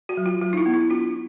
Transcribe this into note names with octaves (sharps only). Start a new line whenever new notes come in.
F#4
F#3
F4
F#3 F4
D#4
E4
B3
E4
D4 F4